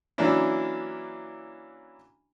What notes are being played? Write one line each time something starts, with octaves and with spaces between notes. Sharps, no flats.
E3 F#3 A#3 C#4 D4 E4